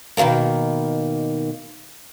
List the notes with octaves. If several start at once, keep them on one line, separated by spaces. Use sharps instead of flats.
B2 D#3 F3 A3 A#3